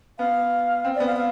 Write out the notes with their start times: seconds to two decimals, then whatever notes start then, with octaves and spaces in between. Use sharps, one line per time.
0.19 B3 F5
0.85 C4
0.95 B3 D5
1.06 F5
1.16 F5